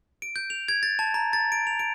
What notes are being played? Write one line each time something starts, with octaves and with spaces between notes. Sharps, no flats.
D7
G6
F7
G#6
A6
A5
A#5
A6
D7
F7
D7